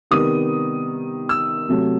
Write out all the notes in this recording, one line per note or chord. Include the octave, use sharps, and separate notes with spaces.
C3 D#3 G3 B3 D#6
E6
C3 F#3 A3